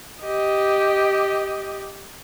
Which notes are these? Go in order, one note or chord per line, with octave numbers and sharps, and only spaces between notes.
G4 D#5